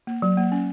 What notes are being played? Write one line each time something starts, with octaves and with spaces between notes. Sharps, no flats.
A#3
F#3
A#3
C#4